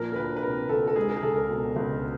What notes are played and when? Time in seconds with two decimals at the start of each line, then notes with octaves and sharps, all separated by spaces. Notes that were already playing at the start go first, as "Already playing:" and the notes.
Already playing: A#2 F3 A#4
0.12 A#4
0.16 D2 B4
0.37 B4
0.43 C3 A#4
0.69 D2 A4
0.87 A4
0.96 G#3 G#4
1.09 A#4
1.17 G#4
1.23 C#2 A4
1.36 A#4
1.49 B2
1.76 C#2